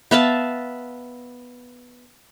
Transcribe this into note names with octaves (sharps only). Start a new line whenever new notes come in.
B3 E5 F5 A5